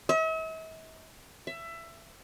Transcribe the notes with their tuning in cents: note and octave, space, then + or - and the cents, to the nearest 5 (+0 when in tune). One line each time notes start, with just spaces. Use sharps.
E5 -45
E5 +20